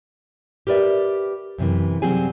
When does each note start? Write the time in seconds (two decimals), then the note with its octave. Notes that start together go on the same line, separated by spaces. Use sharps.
0.67 G4 A#4 B4 D5 E5
1.58 F#2 C3 E3
2.02 C3 F#3 G3 C4 G#4 G#5